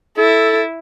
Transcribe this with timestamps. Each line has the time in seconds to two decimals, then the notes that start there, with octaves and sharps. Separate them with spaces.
0.18 E4 A4